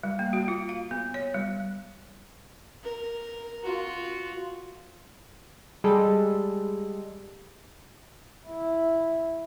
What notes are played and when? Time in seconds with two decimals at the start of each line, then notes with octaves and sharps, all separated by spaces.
0.03 G3
0.19 A#3
0.33 F#4
0.48 F4
0.69 F5
0.91 B3
1.14 C#5
1.34 G3
2.84 A#4
3.64 F4 F#4
5.84 G3 G#3 A4
8.48 E4